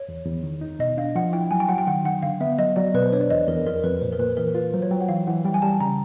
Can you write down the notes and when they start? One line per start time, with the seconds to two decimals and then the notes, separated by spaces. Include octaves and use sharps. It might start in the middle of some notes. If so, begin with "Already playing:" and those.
Already playing: C#5
0.09 E2
0.26 E2
0.43 D#3
0.61 D#4
0.79 B2 D#5
0.97 D4 F5
1.15 F3 F#5
1.33 E4 G5
1.51 F#3 G#5
1.60 G5
1.68 F#3 F#5
1.78 G5
1.87 D#3 F#5
2.05 D#3 F#5
2.22 D3 F5
2.41 B3 E5
2.58 F#3 D#5
2.76 F#3 D5
2.95 B2 B4
3.03 C5
3.12 D4 C#5
3.21 D5
3.30 E2 D#5
3.48 E2 A#4
3.66 F2 A#4
3.84 F2 B4
4.01 A#2 C5
4.12 A#4
4.19 A#2 B4
4.37 E3 A#4
4.55 F4 B4
4.73 F#3 C5
4.82 C#5
4.91 F#3 G5
5.01 F#5
5.09 E3 F5
5.27 E3 F#5
5.45 G3 G5
5.54 G#5
5.62 G3 A5
5.80 C#3 A#5